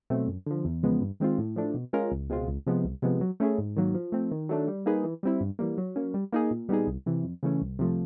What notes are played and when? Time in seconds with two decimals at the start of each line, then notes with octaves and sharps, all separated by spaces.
0.10 B2 F#3 A3 C4
0.28 F#2
0.46 D3 F3
0.65 E2
0.83 C#3 F3 G#3 B3
1.01 G2
1.20 D#3 G#3 C4 F4
1.38 A2
1.56 F3 A3 D4
1.74 B2
1.93 G#3 C#4 F4 A#4
2.12 C#2
2.30 B2 G#3 C4 F4
2.48 C#2
2.67 C3 F3 G#3 B3
2.84 C2
3.02 C3 F3 G#3 B3
3.21 F#3
3.40 A3 C#4 E4 G#4
3.58 G#2
3.76 D#3 F#3 A#3
3.95 F3
4.12 A3 C4
4.32 D#3
4.49 F#3 A3 D4
4.68 G3
4.86 A#3 D#4 G#4 B4
5.04 E3
5.23 G3 C4 E4
5.41 G2
5.59 E3 G3 A#3
5.78 F#3
5.96 A#3 C#4
6.14 G3
6.33 A#3 D#4 G#4
6.51 A#2
6.69 G3 B3 D#4 G#4
6.87 C2
7.06 C3 E3
7.24 F2
7.43 C#3 E3 A3 C#4
7.61 C2
7.79 C3 F3 A3